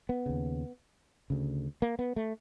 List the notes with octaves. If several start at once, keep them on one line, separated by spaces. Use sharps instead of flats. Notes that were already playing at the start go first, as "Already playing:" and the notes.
B3
D#2 C#3
D2 C#3
A#3
B3
A3